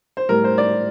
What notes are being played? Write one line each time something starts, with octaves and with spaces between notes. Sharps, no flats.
C5
A2 G3 A#4
C5
D5